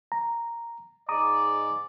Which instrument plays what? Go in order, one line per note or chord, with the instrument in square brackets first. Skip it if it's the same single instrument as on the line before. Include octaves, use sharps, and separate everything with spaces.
[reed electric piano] A#5
[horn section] G#2 G#3 D5 [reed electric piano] A#5 D6 D#6